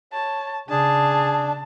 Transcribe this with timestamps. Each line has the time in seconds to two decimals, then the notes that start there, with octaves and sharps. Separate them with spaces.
0.13 C#5 A5
0.69 C#3 D4 G#4 A5